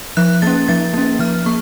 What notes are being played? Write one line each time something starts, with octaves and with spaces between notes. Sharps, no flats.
F3 F#6
A#3 C#4 A6
F3 A6
A#3 C#4
F3 F6
A#3 C#6